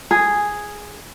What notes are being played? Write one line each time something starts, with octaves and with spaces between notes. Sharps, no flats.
G#4